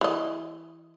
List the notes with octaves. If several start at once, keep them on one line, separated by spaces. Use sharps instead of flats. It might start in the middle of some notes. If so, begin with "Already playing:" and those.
E3 D#5